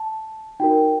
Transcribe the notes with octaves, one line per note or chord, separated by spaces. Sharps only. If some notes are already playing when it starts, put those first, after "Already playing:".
Already playing: A5
D#4 F#4 A#4 G5